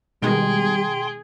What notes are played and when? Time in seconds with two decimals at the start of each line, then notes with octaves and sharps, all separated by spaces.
0.22 B2 D#3 G3 G#3 G#4 G5 C6